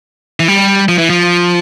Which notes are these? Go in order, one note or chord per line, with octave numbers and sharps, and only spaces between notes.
E3
G3
F3
E3
F3